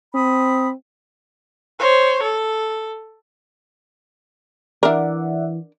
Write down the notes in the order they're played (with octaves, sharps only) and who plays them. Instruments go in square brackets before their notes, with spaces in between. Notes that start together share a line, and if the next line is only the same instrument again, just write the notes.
[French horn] C4 [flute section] B5 D#6
[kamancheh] C5 C#5
A4
[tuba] E3 [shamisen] D4 A#4 [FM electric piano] D5 E5 F#5